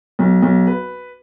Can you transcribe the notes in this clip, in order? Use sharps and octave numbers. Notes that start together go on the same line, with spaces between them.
B1
B1
B4